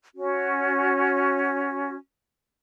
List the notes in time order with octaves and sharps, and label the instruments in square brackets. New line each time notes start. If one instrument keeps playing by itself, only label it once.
[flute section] C#4 F#4